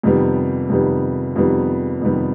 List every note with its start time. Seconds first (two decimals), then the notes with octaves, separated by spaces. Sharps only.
0.03 F2 C3 D#3 G3 B3
0.69 F2 C3 D#3 G3 B3
1.36 F2 C3 D#3 G3 B3
2.01 F2 C3 D#3 G3 B3